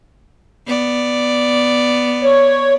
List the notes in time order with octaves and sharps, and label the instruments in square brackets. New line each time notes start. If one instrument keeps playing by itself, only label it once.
[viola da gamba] B3 D5
[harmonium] C#5